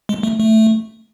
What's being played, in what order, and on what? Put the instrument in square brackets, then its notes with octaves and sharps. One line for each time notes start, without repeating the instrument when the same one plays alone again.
[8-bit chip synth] G#3
A3
A3